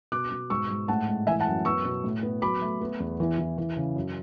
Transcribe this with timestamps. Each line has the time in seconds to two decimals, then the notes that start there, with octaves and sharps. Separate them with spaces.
0.12 B2 D6 F#6
0.32 B2
0.50 G#2 C#6 E6
0.70 G#2
0.88 A2 F#5 A5
1.08 G#3
1.27 E3 E5 G#5
1.40 F#5 A5
1.47 F#2
1.65 B3 C#6 E6
1.85 B2
2.04 A2
2.23 B3
2.42 F#3 B5 D6
2.62 A3
2.81 B3
3.00 E2
3.20 E3
3.38 E3
3.58 E3
3.77 C#3
3.96 F#2